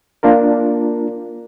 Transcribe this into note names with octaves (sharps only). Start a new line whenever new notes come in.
A#3 D4 F4 A#4